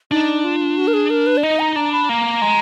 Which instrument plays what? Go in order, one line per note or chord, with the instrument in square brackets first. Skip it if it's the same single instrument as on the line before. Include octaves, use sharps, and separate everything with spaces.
[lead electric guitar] D4 [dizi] D#4
[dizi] F4
F#4
A#4
G#4
A#4
B4
D5
[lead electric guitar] D#4 [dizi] D#5
[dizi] A#5
[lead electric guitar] D4 [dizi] A#5
[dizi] B5
[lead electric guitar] A#3 [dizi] A#5
[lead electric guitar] G#3